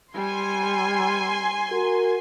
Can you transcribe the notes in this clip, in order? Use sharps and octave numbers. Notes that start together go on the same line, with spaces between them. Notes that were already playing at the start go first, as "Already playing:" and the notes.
G3 G#5 C6
F#4 A#4